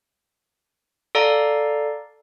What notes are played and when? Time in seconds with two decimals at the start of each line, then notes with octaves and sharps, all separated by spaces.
1.15 A4 D5 F5 A#5